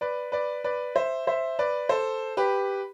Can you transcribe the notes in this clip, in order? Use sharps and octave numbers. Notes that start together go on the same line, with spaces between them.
B4 D5
B4 D5
B4 D5
C5 E5
C5 E5
B4 D5
A4 C5
G4 B4